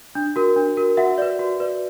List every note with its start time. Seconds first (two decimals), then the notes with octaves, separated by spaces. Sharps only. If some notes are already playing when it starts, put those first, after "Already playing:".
0.15 D4
0.36 F#4 A#4
0.56 D4
0.77 F#4 A#4
0.97 F#4 E5 F#5
1.18 B4 D5
1.39 F#4
1.60 B4 D5